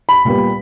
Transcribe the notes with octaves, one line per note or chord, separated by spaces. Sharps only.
B5
A#2 G3 B3